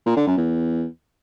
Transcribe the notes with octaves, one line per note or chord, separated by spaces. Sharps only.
A#2
D3
F#2
E2